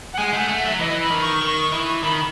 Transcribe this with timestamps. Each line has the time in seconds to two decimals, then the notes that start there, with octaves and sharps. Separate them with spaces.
0.14 F#5
0.18 G#3 G#5
0.33 A3
0.38 F#5
0.48 A3
0.59 E5
0.64 F#3
0.80 E3 D#5
1.00 B5
1.11 D#3
1.21 C#6
1.42 D#3
1.72 E3
2.03 D#3 B5